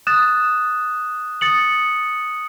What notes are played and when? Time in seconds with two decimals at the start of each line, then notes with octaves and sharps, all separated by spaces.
0.07 D#6 F#6 A6 E7
1.41 D#6 A6 C#7 F#7